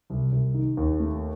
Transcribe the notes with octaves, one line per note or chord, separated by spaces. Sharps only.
C2
C2
D#3
D#2
A3